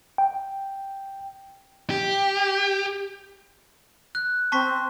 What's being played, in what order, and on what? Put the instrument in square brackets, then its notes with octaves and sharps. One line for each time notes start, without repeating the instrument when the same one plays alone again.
[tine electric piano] G5
[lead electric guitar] G4
[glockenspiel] F#6
[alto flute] C4 [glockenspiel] A5 C#6 B6